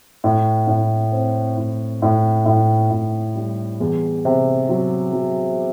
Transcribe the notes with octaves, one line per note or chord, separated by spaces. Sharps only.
A2
A2
C4
A2
A2
A2
A2
G3
E2
C3
F#3
F#3